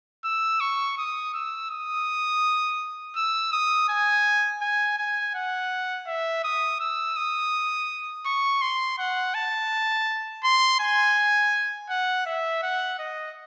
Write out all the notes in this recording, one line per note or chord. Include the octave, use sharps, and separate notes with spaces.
E6
C#6
D#6
E6
D#6
E6
D#6
G#5
G#5
G#5
F#5
E5
D#6
E6
D#6
C#6
C6
F#5
A5
C6
G#5
F#5
E5
F#5
D#5